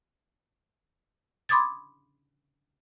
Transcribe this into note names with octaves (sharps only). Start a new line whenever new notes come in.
B5 C6 D6 D#6 G#6 A6